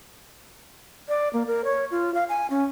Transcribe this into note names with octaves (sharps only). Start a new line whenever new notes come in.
D5
A#3
A#4
C#5
F4
F5
G#5
C#4